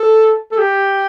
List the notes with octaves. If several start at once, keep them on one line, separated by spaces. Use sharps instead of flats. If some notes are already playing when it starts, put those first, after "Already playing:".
Already playing: A4
A4
G4